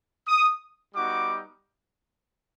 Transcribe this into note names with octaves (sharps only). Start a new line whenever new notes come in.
D#6
G3 B3 D#4 F#4 D6